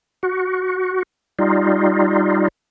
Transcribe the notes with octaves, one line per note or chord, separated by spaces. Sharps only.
F#4
G3 D#4 F4